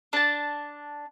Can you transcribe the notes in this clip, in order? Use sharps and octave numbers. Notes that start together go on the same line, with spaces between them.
D4 A5